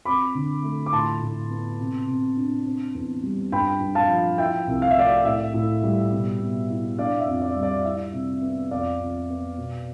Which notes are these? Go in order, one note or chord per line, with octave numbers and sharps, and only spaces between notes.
C4 B5 D6
D3
A3
D6
A2 A5 C6
A2
B3
C3
C3
D4
C4
E2
G3
G2 G5 B5
G2
F5 A5
F3
E4 E5 G5
C2
F5
E5
A3 D5 F5
A2 E5
A2
G3
B2
B2
E4
D4 D5 F5
E5
F2
D5
G3
D5
E4 E5
C3
B3
F2 D5 F5
F2
B3
B2